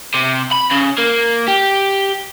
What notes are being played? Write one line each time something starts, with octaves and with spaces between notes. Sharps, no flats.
C3
B5
C#3
A#3
G4